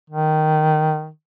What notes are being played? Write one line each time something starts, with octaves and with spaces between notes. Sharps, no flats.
D#3